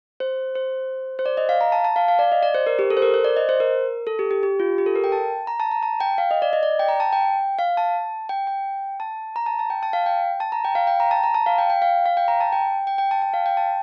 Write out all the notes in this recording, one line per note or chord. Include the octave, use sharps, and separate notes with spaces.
C5
C5
C5
D5
D#5
F5
A#5
A5
A5
F5
F5
D5
D#5
D5
C5
A#4
G4
A4
C5
A#4
C5
D5
D#5
C5
A#4
A4
G4
G4
G4
F4
G4
A4
A#4
G5
A5
A#5
A5
A#5
A5
G5
F5
D#5
D5
D#5
D5
G5
A#5
A5
G5
F5
A5
G5
G5
A5
A#5
A5
A5
G5
A5
F5
G5
A5
A#5
G5
F5
G5
A#5
A5
A#5
A5
F5
G5
G5
F5
F5
G5
A#5
A5
G5
G5
G5
A5
G5
F5
G5
A5